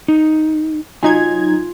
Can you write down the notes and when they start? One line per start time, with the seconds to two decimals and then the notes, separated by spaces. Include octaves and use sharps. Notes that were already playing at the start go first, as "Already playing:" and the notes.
0.08 D#4
1.03 F#3 D#4 F4 G#5 G#6